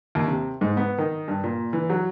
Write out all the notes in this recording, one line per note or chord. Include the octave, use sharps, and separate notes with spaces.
D#2
C3
G#2
B3
D#3
G2
A#2
E3
F#3